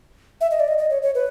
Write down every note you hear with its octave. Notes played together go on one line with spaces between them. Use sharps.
E5
D#5
D5
D#5
D#5
C#5
C#5
B4